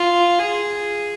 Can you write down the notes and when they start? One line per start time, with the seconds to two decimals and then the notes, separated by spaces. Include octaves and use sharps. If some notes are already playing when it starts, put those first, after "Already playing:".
Already playing: F4
0.39 G#4